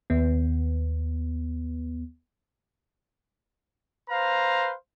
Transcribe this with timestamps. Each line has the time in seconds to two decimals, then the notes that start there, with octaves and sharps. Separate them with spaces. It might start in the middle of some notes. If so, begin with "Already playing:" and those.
0.10 D#2 B3
4.10 B4 C5 F5 A#5